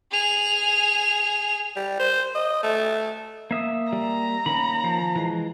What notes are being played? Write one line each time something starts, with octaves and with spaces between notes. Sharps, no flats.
G#4 F7
G3
C5
D#5
A3
A#3 E5 D#6
G3 A#5
D#3 A#3 C#4 B5
F3
E3 G#3